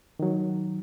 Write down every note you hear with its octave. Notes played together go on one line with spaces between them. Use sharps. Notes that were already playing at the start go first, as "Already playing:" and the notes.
D#3 F#3